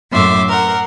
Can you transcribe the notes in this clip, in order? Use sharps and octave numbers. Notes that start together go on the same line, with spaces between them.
F#2 A2 E5 C6 D6
A#4 F#5